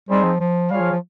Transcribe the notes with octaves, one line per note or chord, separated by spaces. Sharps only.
G3 C4 D#4 G#4 C5
F3
F3
G3 F4 G#4 C#5 F5
F3
F3